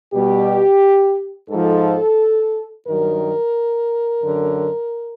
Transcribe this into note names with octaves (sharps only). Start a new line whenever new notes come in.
B2 G3 G4
G#2 F3 A4
G2 D#3 F#3 A#4
F#2 D3 F#3